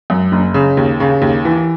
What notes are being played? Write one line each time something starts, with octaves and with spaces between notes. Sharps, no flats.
F#2
F#1
C#3
D#2
C#3
D#2
E3